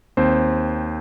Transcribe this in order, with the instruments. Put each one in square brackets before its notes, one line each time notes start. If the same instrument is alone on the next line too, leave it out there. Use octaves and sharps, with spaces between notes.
[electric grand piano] D#2 C4 C5